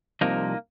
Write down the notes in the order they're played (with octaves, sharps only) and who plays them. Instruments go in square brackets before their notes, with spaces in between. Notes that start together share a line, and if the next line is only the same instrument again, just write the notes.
[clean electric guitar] C2 C3 F3 A#3 D#4